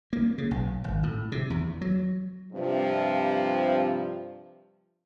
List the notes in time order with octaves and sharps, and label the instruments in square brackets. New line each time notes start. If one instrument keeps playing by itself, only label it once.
[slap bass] A#3
C#3
B1
G#1
A2
C3
E2
F#3
[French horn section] G2 C3 F3